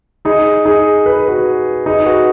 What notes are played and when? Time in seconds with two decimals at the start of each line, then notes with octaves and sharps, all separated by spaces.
0.25 D#4 G#4
0.65 D#4 G#4
1.06 B4
1.28 F#4 B4
1.86 D#4 G#4
2.06 F#4 B4